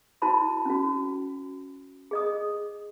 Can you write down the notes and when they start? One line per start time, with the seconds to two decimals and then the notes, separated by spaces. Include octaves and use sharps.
0.22 E4 F#4 C5 A5 B5 C6
0.65 C#4 F#4
2.11 G#4 D#5 D#6